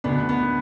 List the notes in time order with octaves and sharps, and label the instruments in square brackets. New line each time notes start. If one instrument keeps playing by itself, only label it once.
[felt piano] D2 D3 B3 D4
B3